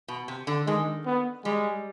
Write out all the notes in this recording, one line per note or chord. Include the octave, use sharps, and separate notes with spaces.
B2
C3
D3
D#3 G#3
B3
G3 G#3